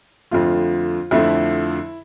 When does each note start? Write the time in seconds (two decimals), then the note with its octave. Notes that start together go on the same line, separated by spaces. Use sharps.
0.31 F2 D3 F3 A3 F4
1.11 F2 D3 F3 A3 E4